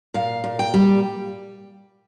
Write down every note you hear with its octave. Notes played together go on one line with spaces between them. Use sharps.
A#2 F5
A#2
G5
G3